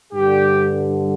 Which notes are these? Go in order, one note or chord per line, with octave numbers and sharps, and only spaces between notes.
G2 D3 G4